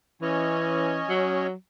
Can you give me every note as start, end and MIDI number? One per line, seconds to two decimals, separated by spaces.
0.22 1.03 52
0.22 1.47 61
0.22 1.47 73
0.22 1.47 75
1.09 1.53 54